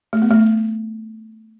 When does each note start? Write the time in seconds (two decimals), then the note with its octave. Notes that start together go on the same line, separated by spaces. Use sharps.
0.13 A3
0.22 B3
0.30 A3